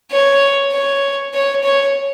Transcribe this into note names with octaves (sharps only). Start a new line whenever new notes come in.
C#5
C#5
C#5
C#5